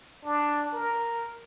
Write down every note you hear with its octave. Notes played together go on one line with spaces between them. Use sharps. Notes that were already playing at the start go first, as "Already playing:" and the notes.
D4
A#4